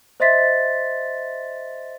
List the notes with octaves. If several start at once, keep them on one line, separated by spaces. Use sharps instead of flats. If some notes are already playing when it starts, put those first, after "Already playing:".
C5 D#5 E5 C6 A6 B6